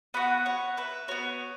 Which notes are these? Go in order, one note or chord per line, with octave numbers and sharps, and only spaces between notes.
B3 F#4 F#5 B5
C#5 F#5
B4 E5
B3 F#4 C#5